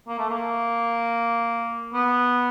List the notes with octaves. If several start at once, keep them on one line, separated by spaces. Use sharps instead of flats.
A#3
A3
A#3
B3